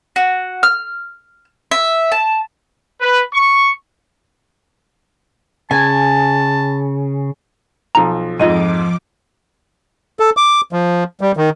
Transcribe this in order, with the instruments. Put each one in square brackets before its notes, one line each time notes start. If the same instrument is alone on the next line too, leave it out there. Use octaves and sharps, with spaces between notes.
[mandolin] F#4
F6
E5
A5
[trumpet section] B4
C#6
[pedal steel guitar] C#3 [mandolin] G#5 [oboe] A5
[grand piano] B1 F3 [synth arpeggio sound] A#5
[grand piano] F2 G#2 [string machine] F3 D6 [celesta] F4 D#5 D#7
[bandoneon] A4
D6
F3
G3
D#3